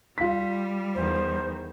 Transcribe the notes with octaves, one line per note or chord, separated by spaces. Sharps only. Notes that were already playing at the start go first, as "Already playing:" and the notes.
G3 F4 B6
E2 D#3 C5